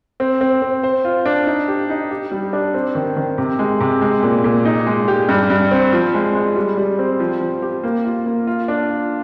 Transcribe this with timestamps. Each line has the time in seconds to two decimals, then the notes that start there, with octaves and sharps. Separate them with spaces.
0.20 C4
0.41 C4
0.62 C4
0.83 C5
1.05 F4
1.26 D4
1.47 D#4
1.68 G4
1.90 D#4
2.11 G4
2.32 G3
2.53 D4
2.74 C4
2.95 D#3
3.17 D#3
3.38 C3
3.59 G#3
3.80 C3
4.02 G#3
4.23 A#2
4.44 A#2
4.65 D#4
4.86 G#3
5.08 G4
5.29 G2
5.50 G2
5.71 C4
5.93 F3
6.14 G#3
6.35 G#3
6.56 G3
6.77 G3
6.99 C4
7.20 F3
7.41 F3
7.62 G4
7.83 A#3
8.05 F4
8.26 A#3
8.47 F4
8.68 D4
8.90 F4